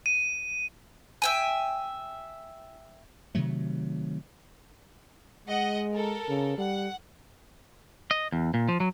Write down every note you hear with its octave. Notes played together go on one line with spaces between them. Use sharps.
D#7
E5 G5 G#5
C3 D#3 F#3 A3
G#3 D#5 F#5
A4 A#4
C#3
G3 F#5
D#5
E2
A#2
F3
F#3